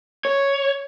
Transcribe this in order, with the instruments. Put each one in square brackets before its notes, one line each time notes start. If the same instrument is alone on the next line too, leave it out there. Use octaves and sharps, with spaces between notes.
[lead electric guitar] C#5